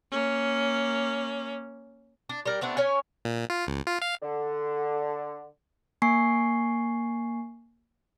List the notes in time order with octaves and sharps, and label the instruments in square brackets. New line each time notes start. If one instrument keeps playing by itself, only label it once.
[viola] A#3 C#4
[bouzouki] D4
G3 A#4
A3 B3 C4 D4
C#4 C#5 G#5
[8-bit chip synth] A#2
F4
C#2
F4
F5
[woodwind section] D3
[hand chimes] A#3 G#5 C#6 C7